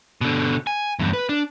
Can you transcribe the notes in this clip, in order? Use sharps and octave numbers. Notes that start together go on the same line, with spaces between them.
B2 D3
G#5
E2 G2
B4
D4